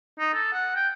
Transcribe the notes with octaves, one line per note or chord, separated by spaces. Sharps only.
D#4
A4
F#5
G5